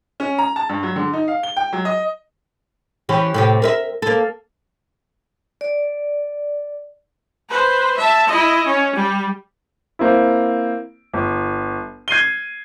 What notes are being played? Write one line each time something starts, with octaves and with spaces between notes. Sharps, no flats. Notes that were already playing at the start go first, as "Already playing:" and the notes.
C#4
A#5
A5
G2
F#3
D3
D#4
F5
G7
G5
F#3
D#5
E3 C#4 G4
A2 C3 G4
A#4 B4 E5
A#3 A4
D5
B4 C5
E5 A5
E4 D#5
C#4
G3
A#3 C4 E4
G1
G#6 C7 D#7 G7